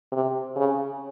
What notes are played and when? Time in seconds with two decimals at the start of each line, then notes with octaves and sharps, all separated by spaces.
0.12 C3
0.56 C#3